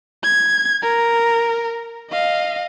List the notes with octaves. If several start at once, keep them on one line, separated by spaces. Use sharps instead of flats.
G#6
A#4
D#5 F5